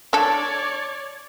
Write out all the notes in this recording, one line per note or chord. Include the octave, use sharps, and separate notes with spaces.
D4 A4 C#5 D5